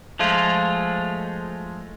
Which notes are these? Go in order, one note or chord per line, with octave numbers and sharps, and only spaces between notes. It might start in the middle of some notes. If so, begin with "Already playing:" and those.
F3 G#3 A3 F4